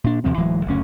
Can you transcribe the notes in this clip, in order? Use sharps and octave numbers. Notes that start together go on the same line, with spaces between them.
A#2 D4
D#2 C3 F3 C4
D1 E3 F#3 G#3
F#1 D2 C#4